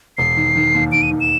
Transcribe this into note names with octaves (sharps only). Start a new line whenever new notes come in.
E1 C7
D#3
D#3
D#2
D#3 D7
D#7
D#3
E7